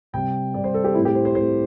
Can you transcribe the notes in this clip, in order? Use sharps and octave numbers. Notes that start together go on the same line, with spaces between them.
C3 G3 C4 G5
C3 G3 C4 D5
C5
A4
G4
A2 A3 C4 E4
G4
C5
C5
A2 A3 C4 C5